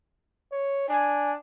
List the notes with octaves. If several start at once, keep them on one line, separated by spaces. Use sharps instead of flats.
C#5
D4 G#5